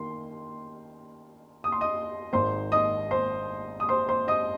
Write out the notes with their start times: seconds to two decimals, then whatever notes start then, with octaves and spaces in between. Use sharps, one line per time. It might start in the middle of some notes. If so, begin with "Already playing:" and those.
Already playing: D#3 A#3 C6
1.64 D#6
1.72 C6
1.81 D#5 D#6
2.33 G#1 G#2 D#3 C5 C6
2.72 D#5 D#6
3.11 C5 C6
3.80 D#6
3.89 C5 C6
4.09 C5 C6
4.28 D#5 D#6